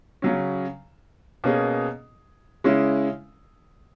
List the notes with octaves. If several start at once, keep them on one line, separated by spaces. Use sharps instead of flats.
C#3 F#3 C#4
B2 A#3 C#4 G#4
C#3 G#3 C#4 E4